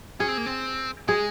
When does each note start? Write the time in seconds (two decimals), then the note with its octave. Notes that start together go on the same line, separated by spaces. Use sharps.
0.20 C#4 G#4
0.28 C4
0.37 A#3
0.46 C4
1.08 G#3 G#4